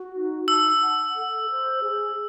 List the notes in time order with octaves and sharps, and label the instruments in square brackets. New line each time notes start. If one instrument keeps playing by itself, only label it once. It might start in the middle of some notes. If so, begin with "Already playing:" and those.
Already playing: [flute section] F#4
D#4
[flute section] A5 [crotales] E6
[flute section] F#5
A4
C5
G#4